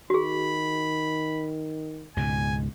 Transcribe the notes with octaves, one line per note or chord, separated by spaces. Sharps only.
D#3 F#4 G#4 B5
C#2 G#2 B2 G#5